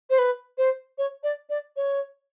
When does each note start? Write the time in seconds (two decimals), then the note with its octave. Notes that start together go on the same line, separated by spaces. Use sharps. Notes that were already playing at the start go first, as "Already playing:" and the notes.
0.10 C5
0.18 B4
0.58 C5
0.98 C#5
1.23 D5
1.49 D5
1.76 C#5